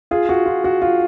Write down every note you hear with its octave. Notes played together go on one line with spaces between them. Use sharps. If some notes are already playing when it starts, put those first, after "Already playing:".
F4 G#4
F#4
F4
F#4
F4